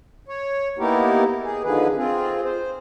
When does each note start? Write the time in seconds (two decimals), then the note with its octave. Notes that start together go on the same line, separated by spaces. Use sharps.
0.28 C#5
0.78 A#3 B3 D#4 E4 G4 A#4
1.43 G#4
1.64 D3 D#3 F3 G#4 B4
1.97 C4 F4 G#4
2.44 C5